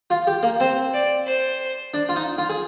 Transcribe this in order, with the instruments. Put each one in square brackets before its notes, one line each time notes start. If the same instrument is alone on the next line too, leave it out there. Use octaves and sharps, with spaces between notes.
[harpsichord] F4
G4
A#3
[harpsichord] C4 [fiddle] C5
[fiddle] D5
C5
[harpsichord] D4
F4
D#4
F4
G#4